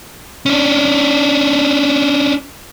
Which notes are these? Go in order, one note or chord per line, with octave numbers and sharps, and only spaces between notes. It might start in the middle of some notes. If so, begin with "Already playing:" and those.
C#4 D4